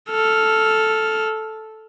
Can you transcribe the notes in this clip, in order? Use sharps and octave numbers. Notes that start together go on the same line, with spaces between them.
A4 F6